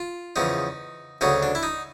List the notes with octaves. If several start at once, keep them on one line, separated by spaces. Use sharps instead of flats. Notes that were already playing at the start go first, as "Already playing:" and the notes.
Already playing: F4
E2 C#3 F3 D#4
D2 C#3 F#3 D#4
D4
E4
D#4